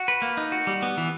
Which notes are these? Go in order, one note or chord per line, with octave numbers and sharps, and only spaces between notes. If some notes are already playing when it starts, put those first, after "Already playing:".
Already playing: F#4
B4
A#3
D#4
F#4
G3
B3
E3